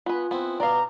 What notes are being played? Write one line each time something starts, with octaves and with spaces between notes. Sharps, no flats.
B3 F4 B4 G#5
B3 C4 E4
B2 B3 D5 F5 A#5